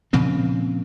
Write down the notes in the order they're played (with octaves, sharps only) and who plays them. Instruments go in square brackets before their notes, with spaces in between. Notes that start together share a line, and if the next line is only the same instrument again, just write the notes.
[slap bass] A#2 C#3 F3 C4